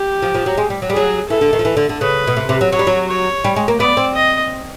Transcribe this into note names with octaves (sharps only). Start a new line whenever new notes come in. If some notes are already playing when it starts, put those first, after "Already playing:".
Already playing: G4
F3
F3
F#3
G#3
G3
F#3
G3
F#3 G#4
E3 A4
D3
D#3
F3
E3
D3
D3
C#3 B4
B2
C3
C3
F#3
F#3 C#5
G3
F#3
C#5
G3
G#3
A#3
B3 D5
C4
D#5